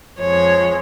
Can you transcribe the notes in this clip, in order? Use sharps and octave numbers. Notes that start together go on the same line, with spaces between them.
F2 F3 G#3 C#5